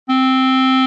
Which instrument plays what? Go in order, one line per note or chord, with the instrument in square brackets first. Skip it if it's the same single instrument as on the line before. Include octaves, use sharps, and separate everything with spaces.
[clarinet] C4